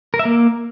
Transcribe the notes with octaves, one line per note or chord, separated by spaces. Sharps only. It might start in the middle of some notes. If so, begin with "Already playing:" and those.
A#4
E5
A#3